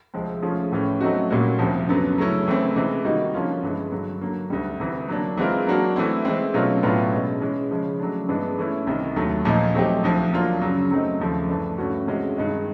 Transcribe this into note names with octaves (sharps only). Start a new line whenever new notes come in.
D2 C3 F3 G#3 C4
F3 A3 C#4 F4 G#4
A2 E3 A3 C#4
F#3 A3 C4 D#4 F#4
A#2 G3 A#3 C#4 F#4
D2 C3 F3
F#2 D3 F#3 B3
C#3 F#3 A3 C#4 E4
C#3 E3 A3 C4
C3 E3 G#3
D#3 G3 A#3 D#4 F#4
D3 F3 A#3 C#4 F4
G2 E3 G#3
G2 D3 F#3
D3 F#3 A#3
D2 D3 G3
D2 C3 E3
F#3 A#3 D4
E3 G#3 C4 F4 A#4
F#3 A#3 D4 F#4 A#4
E3 A3 C4 E4
E3 G#3 C4
B2 F#3 A3 C#4 F4
A2 F#3 B3 D4 F4
B2 G#3 C#4
E3 G#3 C#4
C#3 F3 G#3 C#4
C#3 F#3 A3 D4
G2 E3 G#3 B3 D4
E3 A3 C#4 E4
C2 C3 D#3
D#2 D3 F#3 A3
A#2 F3 A#3 D#4
F#3 A3 C4 D#4 G4
D2 D3 F3
F#3 A#3 D4 F4
F#2 C#3 F#3
F#3 A3 C4 D#4
D#2 C#3 F3 A3
G2 E3 A3 D4
G2 E3 A3 C#4 F#4
C3 E3 G#3 C#4 F#4
G2 D#3 G#3